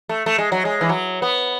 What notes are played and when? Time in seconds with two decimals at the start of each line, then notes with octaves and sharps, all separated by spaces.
0.09 A3
0.26 A3
0.38 G#3
0.52 F#3
0.65 G#3
0.81 E3
0.89 F#3
1.22 B3